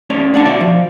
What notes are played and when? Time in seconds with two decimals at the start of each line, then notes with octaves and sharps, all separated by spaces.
0.10 A3 C#4 C#5 D5
0.34 D4 D5 F#5 A5
0.46 B2 F#4 D5 E5
0.61 F3